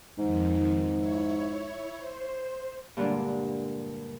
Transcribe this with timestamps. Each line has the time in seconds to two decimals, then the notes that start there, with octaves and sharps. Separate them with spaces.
0.18 F2 G#2 D#3
0.96 E4 C#5
1.96 C5
2.97 G2 A#2 D3 G#3 D4